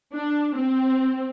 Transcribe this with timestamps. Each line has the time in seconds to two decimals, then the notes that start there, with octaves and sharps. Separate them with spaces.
0.14 D4
0.57 C4